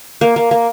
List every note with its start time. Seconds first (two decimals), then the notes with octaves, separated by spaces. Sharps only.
0.21 A#3
0.36 A#3
0.51 A#3